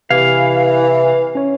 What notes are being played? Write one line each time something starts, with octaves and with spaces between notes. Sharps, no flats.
C3 E3 G4 F5 G#6
C#4 C#5